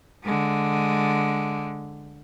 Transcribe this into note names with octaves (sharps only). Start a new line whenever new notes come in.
D3 G#3